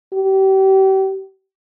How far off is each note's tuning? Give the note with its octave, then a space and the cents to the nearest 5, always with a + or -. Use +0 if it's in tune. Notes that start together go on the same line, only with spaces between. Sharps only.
G4 -35